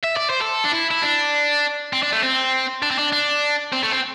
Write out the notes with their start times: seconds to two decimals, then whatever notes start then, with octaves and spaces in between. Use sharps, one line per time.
0.04 E5
0.17 D5
0.30 C5
0.42 A4
0.65 D4
0.72 E4
0.91 E4
1.02 D4
1.93 C4
2.03 D4
2.12 A3
2.23 C4
2.82 D4
2.91 C4
2.99 D4
3.12 D4
3.72 C4
3.83 A3
3.93 C4